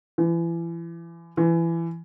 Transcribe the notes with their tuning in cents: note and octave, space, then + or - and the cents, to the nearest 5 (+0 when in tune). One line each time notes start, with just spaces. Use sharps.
E3 +30
E3 +20